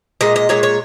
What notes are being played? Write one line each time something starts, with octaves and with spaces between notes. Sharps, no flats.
A#2 G#3 D#5
D#5
A#2 G#3 C#5
C#5